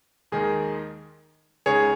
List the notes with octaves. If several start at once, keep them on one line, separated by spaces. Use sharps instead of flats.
D#2 D#3 G#3 D#4 G#4 A#4
C#2 C#3 G#3 D#4 G#4 C#5